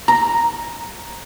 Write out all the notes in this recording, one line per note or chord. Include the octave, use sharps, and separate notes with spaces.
A#5